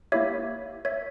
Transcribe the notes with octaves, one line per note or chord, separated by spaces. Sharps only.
A#3 E4 G4 C#5 E5
C#5 E5